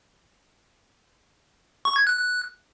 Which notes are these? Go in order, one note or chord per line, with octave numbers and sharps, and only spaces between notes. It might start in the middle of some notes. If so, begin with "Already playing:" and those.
C#6
G#6
F#6
F#6